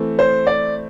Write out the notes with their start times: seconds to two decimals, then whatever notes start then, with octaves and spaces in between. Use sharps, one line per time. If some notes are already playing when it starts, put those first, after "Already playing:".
Already playing: E3 A3 C4
0.19 C5
0.47 D5